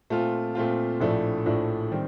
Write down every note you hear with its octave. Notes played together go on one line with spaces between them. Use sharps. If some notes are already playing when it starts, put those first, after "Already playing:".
A#2 A3 C4 F4
A#2 A3 C4 F4
A#1 A2 F3 A3 D4
A#1 A2 F3 A3 D4
D#3 G3 C4